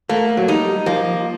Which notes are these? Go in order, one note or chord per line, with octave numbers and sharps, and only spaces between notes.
A3 A#3
F#3
G3 D#4
F3 A#3